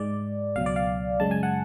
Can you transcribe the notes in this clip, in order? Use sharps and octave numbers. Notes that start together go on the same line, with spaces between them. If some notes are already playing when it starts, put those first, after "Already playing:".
Already playing: G#2 G#3 D5
C#2 B2 F#3 F5
D5
F5
F#2 C#3 G#3 A5
G#5
F#5